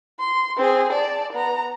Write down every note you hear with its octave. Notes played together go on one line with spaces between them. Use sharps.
C6
C4 G#4
D5 A5
B3 A#5